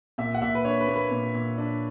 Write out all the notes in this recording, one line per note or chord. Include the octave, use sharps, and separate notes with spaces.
A#2 E5
F#5
A#2 E5
B4
D4 C#5
B4
A#3
B4
A#2
A#2
D4